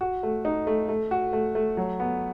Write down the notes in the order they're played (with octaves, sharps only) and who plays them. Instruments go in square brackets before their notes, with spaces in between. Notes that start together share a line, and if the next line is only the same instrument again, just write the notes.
[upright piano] F#4
A3
D#4
A3
A3
F#4
A3
A3
F#3
B3